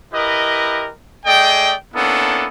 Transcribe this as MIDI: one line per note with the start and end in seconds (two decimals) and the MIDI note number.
0.13 0.89 64
0.13 0.89 67
0.13 0.89 70
0.13 0.89 71
0.13 0.89 75
1.26 1.73 57
1.26 1.73 68
1.26 1.73 74
1.26 1.73 75
1.26 1.73 79
1.93 2.48 58
1.93 2.48 59
1.93 2.48 61
1.93 2.48 62
1.93 2.48 64
1.93 2.48 69